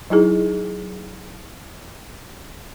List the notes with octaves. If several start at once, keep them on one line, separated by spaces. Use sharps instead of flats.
F#3 D#4 E4 G#4